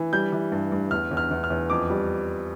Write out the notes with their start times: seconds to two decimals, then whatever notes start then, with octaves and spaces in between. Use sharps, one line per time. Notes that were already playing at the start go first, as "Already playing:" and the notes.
Already playing: E3
0.13 G3 G6
0.32 E3
0.52 G2
0.72 G2
0.91 E2 F6
1.11 E2
1.17 F6
1.31 E2
1.44 F6
1.50 E2
1.70 F2 D6
1.90 G3